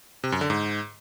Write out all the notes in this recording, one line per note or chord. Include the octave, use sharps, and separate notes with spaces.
C3
F#2
D3
G#2